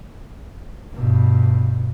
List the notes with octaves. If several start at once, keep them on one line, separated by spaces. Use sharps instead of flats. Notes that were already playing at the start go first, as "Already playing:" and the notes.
G2 B2